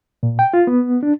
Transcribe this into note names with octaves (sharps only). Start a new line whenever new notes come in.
A#2
G5
F4
B3
D4